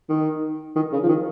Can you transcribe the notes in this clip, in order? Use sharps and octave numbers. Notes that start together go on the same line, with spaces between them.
D#3
D#3
C#3
F3
D#3